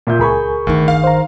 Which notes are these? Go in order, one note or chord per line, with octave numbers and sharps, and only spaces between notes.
A#2 E5 G6
C#2 G#4 A#4 G#5 B5 C#6
G1 D2 D#3
F5
C5 A#5